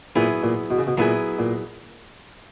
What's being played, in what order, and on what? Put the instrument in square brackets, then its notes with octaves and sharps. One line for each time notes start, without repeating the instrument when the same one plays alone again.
[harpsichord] A#2 [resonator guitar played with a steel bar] F#3 B3 E4 G#4
[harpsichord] A#2
B2
C#3
B2
[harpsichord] A#2 [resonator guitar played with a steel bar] F#3 B3 E4 G#4
[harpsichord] A#2